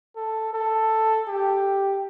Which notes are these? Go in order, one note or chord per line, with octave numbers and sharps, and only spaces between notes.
A4
A4
G4